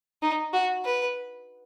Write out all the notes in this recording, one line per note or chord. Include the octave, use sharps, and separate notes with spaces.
D#4
F#4
B4